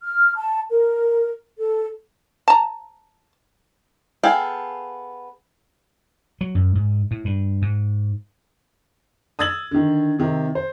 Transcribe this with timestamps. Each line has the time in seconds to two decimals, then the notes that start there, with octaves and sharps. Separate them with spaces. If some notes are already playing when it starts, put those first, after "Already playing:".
0.03 F6
0.36 A5
0.70 A#4
1.59 A4
2.48 A5 A#5
4.23 B3 G#4 A4 F5 G5
6.41 F#3
6.55 F#2
6.75 G#2
7.11 A2
7.25 G2
7.62 G#2
9.39 D#6 E6 G#6 A6 F#7
9.71 D3 D#3
10.19 C3 D#3 C4
10.55 C5